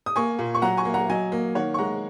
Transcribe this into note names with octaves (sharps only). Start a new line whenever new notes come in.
D#6
A#3 G#5 C#6
A#2
C#6
F#3 F#5 A#5
G#5 C#6
A#3
F#5 A#5
F#3 D#5 G#5
A#3
D#3 C#5 F#5
C#6
G#3 F#5 A#5